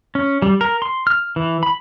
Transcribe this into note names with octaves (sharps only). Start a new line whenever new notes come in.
C#4
G3
A#4
C6
F6
E3
B5